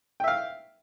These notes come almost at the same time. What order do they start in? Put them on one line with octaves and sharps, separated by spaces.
G5 E5 F5